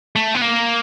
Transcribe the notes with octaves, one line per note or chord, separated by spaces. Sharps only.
A3
B3
A#3